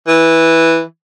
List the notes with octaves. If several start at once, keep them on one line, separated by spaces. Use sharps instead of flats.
E3